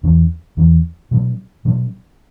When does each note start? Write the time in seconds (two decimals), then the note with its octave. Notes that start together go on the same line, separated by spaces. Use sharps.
0.03 E2 E3 C#4
0.57 E2 E3 C#4
1.11 B2 F#3 C#4
1.65 B2 F#3 C#4